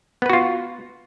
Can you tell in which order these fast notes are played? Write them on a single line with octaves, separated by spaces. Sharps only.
B3 B4 F#4 F4